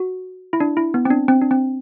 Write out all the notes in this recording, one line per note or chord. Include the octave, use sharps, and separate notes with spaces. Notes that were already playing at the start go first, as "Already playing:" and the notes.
Already playing: F#4
E4
D4
E4
B3
C4
D4
C4
D4
C4